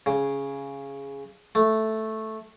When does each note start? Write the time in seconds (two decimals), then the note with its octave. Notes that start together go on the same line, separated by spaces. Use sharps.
0.06 C#3
1.55 A3